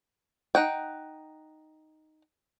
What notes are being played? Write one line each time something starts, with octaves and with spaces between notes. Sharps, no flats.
D#4 F#5 G5